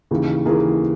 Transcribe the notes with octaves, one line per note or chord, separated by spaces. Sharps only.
D#2 C#3 E3
D#2 C#3 E3 G#4 A#4